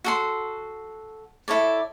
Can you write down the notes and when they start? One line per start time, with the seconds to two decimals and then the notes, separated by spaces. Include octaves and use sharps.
0.04 F#4 A4 C6
1.48 E4 A4 C#5 D5